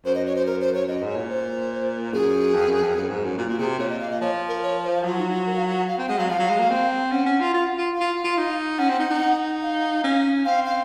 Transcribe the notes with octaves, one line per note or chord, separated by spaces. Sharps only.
F#2 C5
D#5
C#5
C5
A#4
C5
C#5
F#2 D#5
G#2
C#5
A#2
C5
F#2 G#4
F2
F#2
F2
F#2
G#2
F#2
A#2 F#4
A#2 F#4
C3 G#4
A#2 C#5
D#5
F5
D#5
F3 C#5
A#4
C#5
C5
F#3 F4
D#4
F4
A#4
F5
F#5
F#5
F5
C4
G#3 F#5
F#3 F5
F3 F5
F#3
G#3
A#3
C4
C#4 F#5
C#4
F4
F4
F4
F5
F4
F4
D#4
C#4 F#5
C4
D#4
D#4
F5
C#4
C4 F5
F5